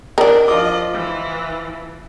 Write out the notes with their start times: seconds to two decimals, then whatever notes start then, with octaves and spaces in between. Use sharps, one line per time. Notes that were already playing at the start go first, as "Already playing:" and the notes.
0.18 D4 A#4 D5 D#5
0.48 F3 F4 D#5 D6
0.93 E3